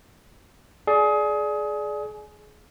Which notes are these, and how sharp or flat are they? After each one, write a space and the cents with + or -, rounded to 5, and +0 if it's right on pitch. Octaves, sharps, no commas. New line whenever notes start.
G#4 +25 D5 +0